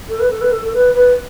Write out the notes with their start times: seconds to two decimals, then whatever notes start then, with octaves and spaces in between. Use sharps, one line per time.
0.09 A4
0.20 B4
0.30 A4
0.41 B4
0.51 A4
0.65 A4
0.74 B4
0.94 B4